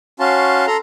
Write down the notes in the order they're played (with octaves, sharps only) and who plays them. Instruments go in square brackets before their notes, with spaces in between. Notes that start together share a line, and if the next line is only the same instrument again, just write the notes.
[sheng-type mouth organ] C#4 F#4 F5 A5 C6
A4 A#5 C6